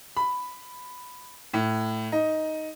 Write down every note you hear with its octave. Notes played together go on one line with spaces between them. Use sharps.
B5
A2
D#4